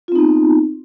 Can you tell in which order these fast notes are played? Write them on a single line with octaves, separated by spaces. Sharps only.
F4 C4 D#4 B3